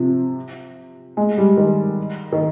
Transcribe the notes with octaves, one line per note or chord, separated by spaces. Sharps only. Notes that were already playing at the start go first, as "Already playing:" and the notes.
Already playing: C3 F3
G#3
G3
D#3
D#3